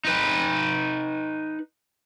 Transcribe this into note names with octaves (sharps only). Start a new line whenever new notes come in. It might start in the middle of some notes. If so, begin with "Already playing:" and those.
D#4 B4